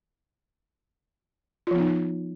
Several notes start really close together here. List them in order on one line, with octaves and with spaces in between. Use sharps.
F4 F3 B3 D#4